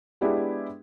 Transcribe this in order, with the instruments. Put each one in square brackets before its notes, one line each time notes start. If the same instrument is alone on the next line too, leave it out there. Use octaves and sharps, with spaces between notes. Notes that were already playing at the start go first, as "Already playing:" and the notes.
[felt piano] G#3 B3 D4 E4 G4